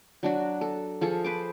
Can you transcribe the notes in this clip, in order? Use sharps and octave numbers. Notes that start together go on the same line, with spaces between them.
F#3 D4 F#4
A4
F3 G#4 A4 C#6
B4 C5 D6